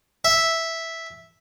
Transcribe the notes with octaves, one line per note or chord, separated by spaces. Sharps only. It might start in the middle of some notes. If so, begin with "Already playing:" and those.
E5